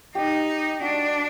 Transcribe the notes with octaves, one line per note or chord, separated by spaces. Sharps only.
D#4 G4
D4 F#4